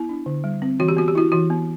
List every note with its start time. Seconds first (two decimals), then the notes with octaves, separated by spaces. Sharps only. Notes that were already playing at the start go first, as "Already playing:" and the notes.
Already playing: B3 E4
0.09 D4
0.26 D3
0.44 G3
0.62 C4
0.80 E3 F#4
0.88 G4
0.97 B3 F#4
1.08 G4
1.15 E4 F#4
1.32 E3 F#4
1.50 B3